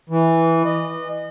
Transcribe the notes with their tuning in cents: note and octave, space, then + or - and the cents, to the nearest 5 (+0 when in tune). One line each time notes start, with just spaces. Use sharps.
E3 -5
D#5 -30